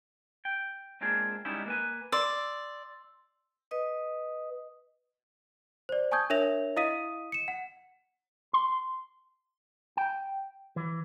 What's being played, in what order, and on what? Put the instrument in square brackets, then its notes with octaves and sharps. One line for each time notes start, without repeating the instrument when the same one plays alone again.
[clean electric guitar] G5
G#3 A#3 C4 D4 F4 G#4
G3 G#3 B3 C#4 D#4 E4
A#3 B4 G#5
[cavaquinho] D5 [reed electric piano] C6 E6
[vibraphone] B4 D#5 D#6
[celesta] C5 D5
G#5 A5 C#6 D#6 G6 G#6
D4 A#4 C#5 E5 A#6 F7
E4 D#5 F5 D#6 B6 D#7
C#7 E7
F#5
[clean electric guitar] C6
G5
E3